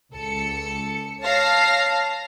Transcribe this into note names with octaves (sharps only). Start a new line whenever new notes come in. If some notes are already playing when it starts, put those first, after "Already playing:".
C#2 A4 C#7
C#5 F5 A5 A#6 C7